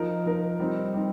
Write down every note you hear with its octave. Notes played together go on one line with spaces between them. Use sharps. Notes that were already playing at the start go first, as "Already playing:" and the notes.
Already playing: F3 D#4 A#4
F3 D#4 A#4
G3 C4 D#4
G3 C4 D#4